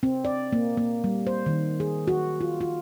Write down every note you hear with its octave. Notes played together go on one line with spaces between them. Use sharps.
C4
D5
A#3
A#3
G3
C5
D#3
G#4
F#4
F4
F4